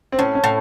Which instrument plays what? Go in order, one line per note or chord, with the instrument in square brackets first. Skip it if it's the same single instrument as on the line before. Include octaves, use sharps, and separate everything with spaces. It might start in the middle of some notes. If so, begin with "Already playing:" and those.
[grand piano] C4
[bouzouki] A2 [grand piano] C#4
[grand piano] C#4
[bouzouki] A2